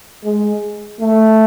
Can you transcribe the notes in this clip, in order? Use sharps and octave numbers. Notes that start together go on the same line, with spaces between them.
G#3
A3